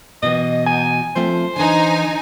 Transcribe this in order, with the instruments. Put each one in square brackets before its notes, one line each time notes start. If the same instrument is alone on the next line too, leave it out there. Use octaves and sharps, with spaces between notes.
[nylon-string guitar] B2 E3 [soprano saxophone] D#5
[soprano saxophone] G#5
[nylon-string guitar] F3 A3 C4 [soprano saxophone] C5
[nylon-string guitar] D3 E3 [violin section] D#4 G#5